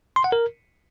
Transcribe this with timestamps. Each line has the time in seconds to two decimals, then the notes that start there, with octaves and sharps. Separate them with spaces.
0.16 C6
0.24 F#5
0.32 A#4